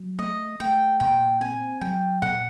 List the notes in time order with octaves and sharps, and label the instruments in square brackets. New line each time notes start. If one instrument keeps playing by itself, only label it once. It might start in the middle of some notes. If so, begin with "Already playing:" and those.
Already playing: [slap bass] F#3
[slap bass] A3 [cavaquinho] D#5
[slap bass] A3 [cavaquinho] G5
[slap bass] A#2 [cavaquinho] G5
[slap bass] C4 [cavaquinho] G#5
[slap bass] F#3 [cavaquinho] G5
[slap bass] A#2 [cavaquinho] F#5